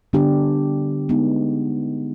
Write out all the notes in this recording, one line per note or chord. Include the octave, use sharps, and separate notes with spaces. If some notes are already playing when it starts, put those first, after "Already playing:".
D3 G3 B3 D4 G4
G#3 B3 D#4